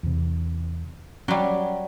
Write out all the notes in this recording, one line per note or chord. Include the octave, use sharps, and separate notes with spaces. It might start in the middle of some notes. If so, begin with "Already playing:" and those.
E2 C3
F#3 G3 C#4